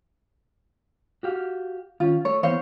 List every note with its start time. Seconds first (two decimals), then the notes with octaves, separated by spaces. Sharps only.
1.23 F#4 G4 F5
2.00 D#3 C#4 F4
2.25 A3 C#5
2.43 E3 A#3 B3 C5 C#5 F5